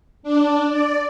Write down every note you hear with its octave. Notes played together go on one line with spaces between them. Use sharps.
D4
D5